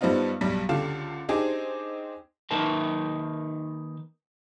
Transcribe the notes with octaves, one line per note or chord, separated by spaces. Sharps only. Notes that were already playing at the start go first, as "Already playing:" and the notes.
G2 G3 B3 C4 D#4 F4
B1 G2 G3 B6
C#2 D3 G4 A4 F5 E7
C4 D4 D#4 G4 G#4 C5
D#3 A#3 D#4 A#4 B4 A5